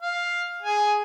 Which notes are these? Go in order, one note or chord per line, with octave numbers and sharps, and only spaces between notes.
F5
G#4 G#5